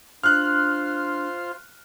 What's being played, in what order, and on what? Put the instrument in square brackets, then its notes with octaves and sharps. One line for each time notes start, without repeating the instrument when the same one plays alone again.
[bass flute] D4 [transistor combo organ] F4 C5 [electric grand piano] F6 F#6